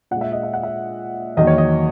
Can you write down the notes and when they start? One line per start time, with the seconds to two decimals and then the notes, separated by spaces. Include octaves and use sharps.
0.11 A#2 G#3 F#5
0.21 E5
0.32 D#5
0.43 E5
0.54 F#5
0.63 E5
1.37 E2 D#3 F#3 A#3 D#5
1.47 C#5
1.58 D#5